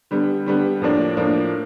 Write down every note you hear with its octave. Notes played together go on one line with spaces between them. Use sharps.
D3 G3 B3
D3 G3 B3
A2 F3 A#3 D4
A2 F3 A#3 D4